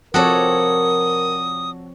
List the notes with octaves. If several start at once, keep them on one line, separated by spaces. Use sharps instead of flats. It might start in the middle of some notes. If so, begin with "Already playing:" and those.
F3 C4 F#4 A4 A#4 C#5 D5 D#6